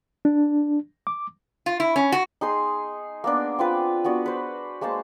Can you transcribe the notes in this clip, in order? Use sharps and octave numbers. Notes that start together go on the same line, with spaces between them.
D4
D6
F4
E4
C#4
F#4
D#4 G#4 C6 D#6
A#3 B3 D4
C4 F4 B4
B3 D4 F#4
B4 C5
G#3 A#3 C5 A5